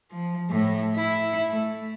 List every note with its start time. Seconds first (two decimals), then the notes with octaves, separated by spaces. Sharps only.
0.11 F3
0.50 A2
0.96 E4
1.49 A3